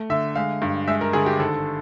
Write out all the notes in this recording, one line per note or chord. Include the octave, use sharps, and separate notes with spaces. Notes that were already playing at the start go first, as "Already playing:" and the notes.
Already playing: A3
D3 E5
G#3 F5
G2
G#3 E5
A#4
D3 G#4
G4
G#1 A4